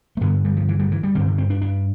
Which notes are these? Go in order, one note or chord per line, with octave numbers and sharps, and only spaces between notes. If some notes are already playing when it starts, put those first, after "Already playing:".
A3
G2 D3 B3
G3
F3
E3
G3
E3
G3
G2 D3 C4
D3
C4
D4
D4